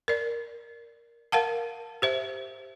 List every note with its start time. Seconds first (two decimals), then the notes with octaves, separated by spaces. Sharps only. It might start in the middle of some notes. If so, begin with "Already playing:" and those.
0.08 A#4 D5
1.32 A#4 F5 F#5 A5
2.02 G4 C5 E5